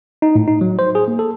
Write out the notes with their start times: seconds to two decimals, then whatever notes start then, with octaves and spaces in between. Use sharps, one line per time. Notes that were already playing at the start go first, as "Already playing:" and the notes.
0.22 D#4
0.35 A2
0.48 D#4
0.61 F#3
0.79 C5
0.95 G#4
1.08 A#3
1.19 A4